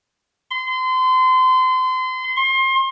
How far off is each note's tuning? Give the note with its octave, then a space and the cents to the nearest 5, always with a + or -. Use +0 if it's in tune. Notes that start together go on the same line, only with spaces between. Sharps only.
C6 -30
C6 +30